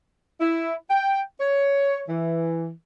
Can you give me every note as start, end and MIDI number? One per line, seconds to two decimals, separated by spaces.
0.40 0.75 64
0.90 1.21 79
1.40 2.02 73
2.09 2.71 52